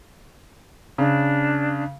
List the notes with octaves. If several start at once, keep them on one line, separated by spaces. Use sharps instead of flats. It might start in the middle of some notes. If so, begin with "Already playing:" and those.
C#3 D4